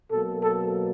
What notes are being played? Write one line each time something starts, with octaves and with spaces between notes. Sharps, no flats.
B2 F#3 A#3 A4
A4